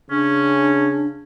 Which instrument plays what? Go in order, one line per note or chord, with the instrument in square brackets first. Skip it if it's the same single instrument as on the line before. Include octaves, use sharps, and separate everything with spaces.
[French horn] C#3 [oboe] C#4 [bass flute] D4